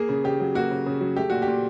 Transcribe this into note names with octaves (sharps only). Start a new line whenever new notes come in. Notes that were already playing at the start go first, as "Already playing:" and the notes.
Already playing: A#3 G#4
C#3
C#3 G4
F#3
A#3 F#4
C#3
C#3
F#3
A3 G4
A#2 F#4
G4
A#2